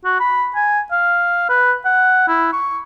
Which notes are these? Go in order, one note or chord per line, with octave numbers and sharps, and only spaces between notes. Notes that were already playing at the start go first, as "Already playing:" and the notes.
F#4
B5
G#5
F5
B4
F#5
E4
C#6